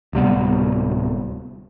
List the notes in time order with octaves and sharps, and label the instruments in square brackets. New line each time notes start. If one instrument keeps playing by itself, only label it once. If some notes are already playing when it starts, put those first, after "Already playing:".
[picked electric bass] D1 C3 G3 B3